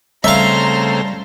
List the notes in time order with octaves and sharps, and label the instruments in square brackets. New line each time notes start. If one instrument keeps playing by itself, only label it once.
[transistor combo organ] C#3 A3 C4 [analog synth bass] G3 [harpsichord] E5 F5 [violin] A#5 C6